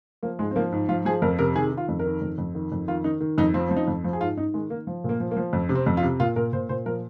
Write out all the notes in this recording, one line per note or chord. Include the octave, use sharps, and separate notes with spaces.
F3 A#3
G#2 G#3
C4
F3 A#3
G#2
F3 F4
F3 G#4
F2 A#4
C3 A#4
D#3 G#4
D#3
F4
F2
A#4
D#3
F2
F2
D#3
F2
D#3 F4
D#3 D#4
D#3
F2 D#4
F3 C4
F3 C4
D#4
F2
F3
G#4
G#2 F4
G#2 D#4
D#3 G#3
D#3 A#3
F3
A#2
A#3
F3
A#3
F3
F2
C3
C4
F2
F4
C3
A#2 F4
A#2 A#4
A#2 C5
A#2 C5
F3 A#4